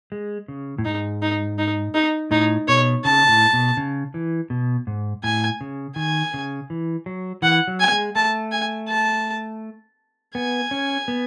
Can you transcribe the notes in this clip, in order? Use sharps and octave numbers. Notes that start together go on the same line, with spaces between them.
G#3
C#3
A2
G#2 D#4
D#4
D#4
D#4
A2 D#4
B2 C#5
C#3 A5
A2
B2
C#3
E3
B2
G#2
A2 G#5
C#3
D#3 G#5
C#3
E3
F#3
E3 F#5
F#3
G#5
G#3
A3 A5
G#5
A5
B3 G#5
C#4
B3